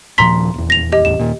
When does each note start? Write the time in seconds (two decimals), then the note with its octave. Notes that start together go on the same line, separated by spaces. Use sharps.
0.18 D#1 A#2 F3 A#5 C6 B6
0.54 D#1 E2
0.70 A#6 F7
0.92 G4 D#5
1.05 D#1 A1 E2 E7
1.19 D#2 A#2